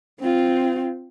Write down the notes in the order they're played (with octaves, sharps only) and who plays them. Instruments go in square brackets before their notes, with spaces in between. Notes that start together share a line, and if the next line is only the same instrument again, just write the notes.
[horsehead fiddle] C4 F4